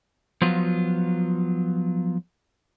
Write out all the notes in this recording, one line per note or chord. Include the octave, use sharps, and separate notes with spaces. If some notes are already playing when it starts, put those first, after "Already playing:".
F3 F#3 B3 F4